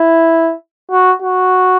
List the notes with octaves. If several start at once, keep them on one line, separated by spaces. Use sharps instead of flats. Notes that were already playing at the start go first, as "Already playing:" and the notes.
Already playing: E4
F#4
F#4